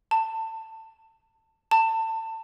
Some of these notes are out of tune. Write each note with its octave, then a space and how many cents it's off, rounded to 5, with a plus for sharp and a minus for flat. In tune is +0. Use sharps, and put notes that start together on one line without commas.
A5 +25
A5 +30